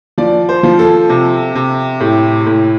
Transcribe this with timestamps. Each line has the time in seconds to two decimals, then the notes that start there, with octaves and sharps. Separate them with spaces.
0.18 F3 D5
0.49 C5
0.63 F3
0.79 A4
1.09 C3
1.55 C3
2.00 A2 G4
2.46 A2